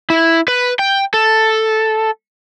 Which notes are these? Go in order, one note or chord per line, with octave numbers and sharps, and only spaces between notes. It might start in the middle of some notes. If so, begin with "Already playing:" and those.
E4
B4
G5
A4